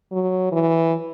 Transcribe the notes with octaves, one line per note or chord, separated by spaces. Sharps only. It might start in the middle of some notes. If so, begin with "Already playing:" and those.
F#3
E3